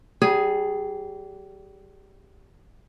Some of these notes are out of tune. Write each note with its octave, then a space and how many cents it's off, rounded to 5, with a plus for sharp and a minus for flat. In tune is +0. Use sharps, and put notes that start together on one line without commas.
G3 -30 G#4 +0